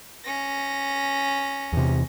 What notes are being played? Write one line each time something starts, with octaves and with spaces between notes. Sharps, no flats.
C#4 A#6
E2 C3